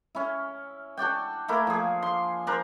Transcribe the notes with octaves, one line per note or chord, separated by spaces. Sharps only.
C#4 E4
D4 F#4 D5 G5
A3 A#3 E4
F3 G#4
C6
D4 A#4 C5